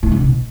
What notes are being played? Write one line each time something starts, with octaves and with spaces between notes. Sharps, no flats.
A2
C#3
B2